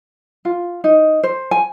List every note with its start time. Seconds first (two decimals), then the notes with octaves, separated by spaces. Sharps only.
0.45 F4
0.84 D#4
1.23 C5
1.51 G#5